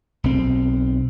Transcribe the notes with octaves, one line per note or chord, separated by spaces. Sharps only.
B1 C4